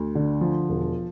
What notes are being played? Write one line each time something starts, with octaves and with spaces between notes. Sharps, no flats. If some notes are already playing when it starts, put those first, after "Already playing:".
Already playing: D2
D3
F3
E1